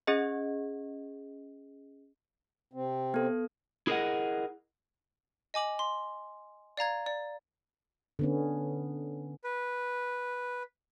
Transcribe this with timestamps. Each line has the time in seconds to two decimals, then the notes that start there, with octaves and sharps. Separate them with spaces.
0.07 C#4 G#4 D#5
2.73 C3 C4
3.14 B3 A4
3.87 E4 G#4 A#4 C5 D#5 F#5
5.54 D#5 G#5 D6 F#7
5.79 C6
6.77 D5 F5 A#5 G#6
7.06 D5
8.19 D3 B3 C#4
9.44 B4